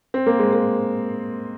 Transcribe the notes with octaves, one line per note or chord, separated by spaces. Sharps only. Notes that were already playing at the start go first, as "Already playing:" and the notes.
C4
A#3
G#3
A#3